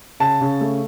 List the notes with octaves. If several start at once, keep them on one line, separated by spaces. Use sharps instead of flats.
C#3 A5
C#3
A3